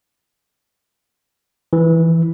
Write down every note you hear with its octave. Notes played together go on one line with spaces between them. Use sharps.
E3